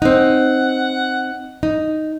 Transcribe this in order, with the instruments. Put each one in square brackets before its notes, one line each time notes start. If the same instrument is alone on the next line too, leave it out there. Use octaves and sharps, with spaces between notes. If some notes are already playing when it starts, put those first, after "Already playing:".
[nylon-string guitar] C4 D#4 [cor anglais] F#5
[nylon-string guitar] D#4